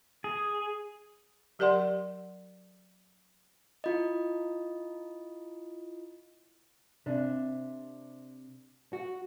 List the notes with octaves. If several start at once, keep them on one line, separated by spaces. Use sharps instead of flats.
G#4
F#3 G4 A#4 D5 F#5 C6
E4 F4 D#5
C3 D4
F#4